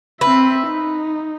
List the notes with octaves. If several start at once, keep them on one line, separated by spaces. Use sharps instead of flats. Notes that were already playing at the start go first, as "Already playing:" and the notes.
C4 B4 E5
D#4